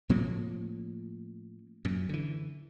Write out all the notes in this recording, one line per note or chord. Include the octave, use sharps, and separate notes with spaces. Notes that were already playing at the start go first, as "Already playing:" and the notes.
A2 F3 A#3 C#4
F#2 A#2
D3 E3